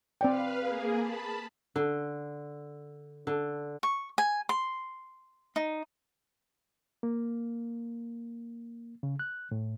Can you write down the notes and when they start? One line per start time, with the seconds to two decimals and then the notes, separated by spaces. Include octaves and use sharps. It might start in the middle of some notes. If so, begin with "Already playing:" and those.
0.21 C4 B4 D5 F5 G5
0.60 A#3 G#4
0.98 A5 B5
1.76 D3
3.27 D3
3.83 C#6
4.18 G#5
4.49 C6
5.56 D#4
7.03 A#3
9.03 C#3
9.19 F#6
9.51 A2